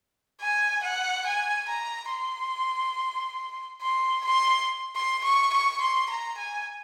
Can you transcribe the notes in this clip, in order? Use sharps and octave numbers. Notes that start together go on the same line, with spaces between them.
G#5
F#5
G#5
A#5
C6
C6
C6
C6
C#6
C#6
C6
A#5
G#5